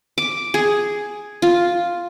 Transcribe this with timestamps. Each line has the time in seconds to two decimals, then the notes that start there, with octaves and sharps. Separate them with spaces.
0.18 D6
0.54 G#4
1.42 F4